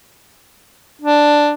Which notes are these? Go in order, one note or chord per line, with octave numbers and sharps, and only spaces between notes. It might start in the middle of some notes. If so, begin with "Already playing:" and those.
D4